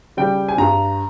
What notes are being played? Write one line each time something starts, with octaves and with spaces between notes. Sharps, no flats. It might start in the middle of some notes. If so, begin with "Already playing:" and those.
C#3 G3 G5
G#5
G2 A#5